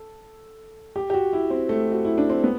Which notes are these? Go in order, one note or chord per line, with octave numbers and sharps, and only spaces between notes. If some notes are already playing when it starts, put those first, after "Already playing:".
Already playing: A4
G4
G4
F#4
E4
C4
A3
F#4
E4
D4
C4
B3